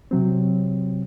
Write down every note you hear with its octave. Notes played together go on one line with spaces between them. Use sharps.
C3 F#3 C4